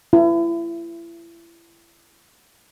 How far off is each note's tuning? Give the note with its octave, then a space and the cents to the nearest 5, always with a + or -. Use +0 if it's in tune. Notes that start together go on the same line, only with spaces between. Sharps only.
E4 +35